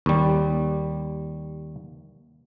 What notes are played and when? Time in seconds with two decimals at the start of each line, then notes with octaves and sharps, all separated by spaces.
0.06 D#2 G3